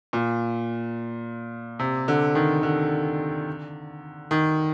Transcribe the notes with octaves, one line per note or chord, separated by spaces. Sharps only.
A#2
C3
D3
D#3
D3
D#3